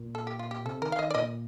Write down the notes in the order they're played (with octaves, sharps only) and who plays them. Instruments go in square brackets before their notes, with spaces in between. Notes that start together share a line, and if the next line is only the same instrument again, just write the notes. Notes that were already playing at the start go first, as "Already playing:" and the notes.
Already playing: [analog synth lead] A#2
[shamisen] A4
G4
F4
G4
[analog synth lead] C3 [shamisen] A4
[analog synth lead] D#3 [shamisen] A#4
[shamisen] F5
[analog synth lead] D#3 [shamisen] D#5
[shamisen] D5
[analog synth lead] A#2 [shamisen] D#5